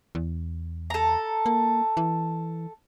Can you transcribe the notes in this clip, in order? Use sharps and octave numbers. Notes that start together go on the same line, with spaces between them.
E2
A4 A#5
A#3
E3